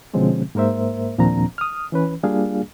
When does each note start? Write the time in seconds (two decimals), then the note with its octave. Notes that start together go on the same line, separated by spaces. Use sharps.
0.14 B2 D3 F3 G#3 C4 C#4
0.55 G#2 A#3 A#4 C5 E5
1.18 D#2 A#2 F3 C4 D4 A#5
1.58 D#6 F6
1.92 E3 C#4 B4
2.23 G3 A#3 D4 F4 G#4 F5